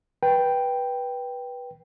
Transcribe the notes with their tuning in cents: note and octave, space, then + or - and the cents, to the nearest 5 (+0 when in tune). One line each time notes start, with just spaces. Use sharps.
B4 -15 G5 +0